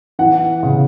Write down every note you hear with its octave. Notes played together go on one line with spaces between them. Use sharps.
E3 F#5
C#3